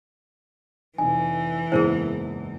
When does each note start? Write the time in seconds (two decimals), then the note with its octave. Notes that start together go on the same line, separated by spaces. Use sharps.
0.98 F1 E3 D#4 G#5
1.72 F#1 E2 G#2 E4 G#4 A#4 C5